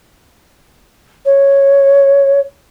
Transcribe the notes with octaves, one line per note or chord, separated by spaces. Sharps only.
C#5